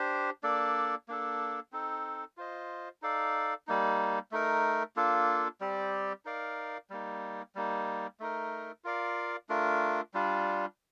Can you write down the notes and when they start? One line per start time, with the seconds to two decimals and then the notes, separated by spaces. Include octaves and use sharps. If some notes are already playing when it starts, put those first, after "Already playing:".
Already playing: D4 G4 C5
0.43 A#3 D4 A4 D5
1.08 A#3 D4 A4
1.72 C4 D#4 A4
2.37 F4 C5 D#5
3.02 D#4 A4 D5 F5
3.67 G3 A#3 D#4
4.32 A3 D#4 A#4
4.96 A#3 D4 F4 A4
5.61 G3 C4 G4 D5
6.25 D#4 A#4 D5 F5
6.90 G3 A#3 D#4
7.55 G3 A#3 D#4
8.20 A3 D#4 A#4
8.84 F4 A#4 D5 F5
9.49 A3 D4 F4 A#4
10.14 G3 D4 F4